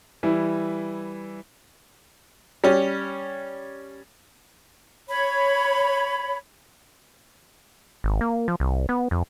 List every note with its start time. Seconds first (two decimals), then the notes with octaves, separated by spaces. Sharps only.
0.23 E3 G3 E4
2.64 G3 C#4
5.08 C#5 B5
8.04 G#1
8.21 A#3
8.48 F3
8.60 C2
8.89 B3
9.11 F2